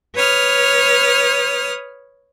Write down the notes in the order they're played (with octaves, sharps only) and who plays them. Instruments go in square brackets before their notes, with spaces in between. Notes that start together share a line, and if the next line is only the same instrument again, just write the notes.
[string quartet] B4 C#5 D#6 F6